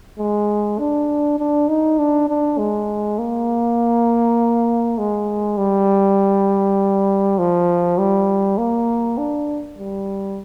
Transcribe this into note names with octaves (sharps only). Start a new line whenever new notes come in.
G#3
D4
D4
D#4
D4
D4
G#3
A#3
G#3
G3
F3
G3
A#3
D4
G3